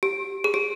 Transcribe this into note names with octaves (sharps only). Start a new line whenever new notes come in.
G4
G#4
G4